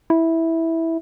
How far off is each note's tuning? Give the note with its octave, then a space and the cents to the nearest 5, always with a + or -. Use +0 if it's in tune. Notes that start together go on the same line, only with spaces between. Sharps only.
E4 -10